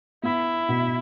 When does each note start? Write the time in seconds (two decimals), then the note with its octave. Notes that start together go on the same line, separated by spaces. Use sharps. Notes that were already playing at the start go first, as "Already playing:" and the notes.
0.23 B3 E4
0.69 B2